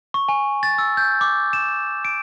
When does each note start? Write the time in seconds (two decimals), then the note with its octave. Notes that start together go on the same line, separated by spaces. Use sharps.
0.14 C#6
0.29 G#5
0.63 A6
0.78 E6
0.97 G6
1.21 D6
1.53 E7
2.05 D7